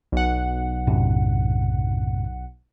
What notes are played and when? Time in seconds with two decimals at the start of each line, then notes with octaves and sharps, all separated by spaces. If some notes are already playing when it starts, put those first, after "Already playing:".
0.12 B1 F#5
0.87 F#2 A2 C3